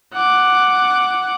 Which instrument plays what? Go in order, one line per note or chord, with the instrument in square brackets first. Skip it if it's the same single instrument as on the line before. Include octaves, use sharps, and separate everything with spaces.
[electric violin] F#5 D6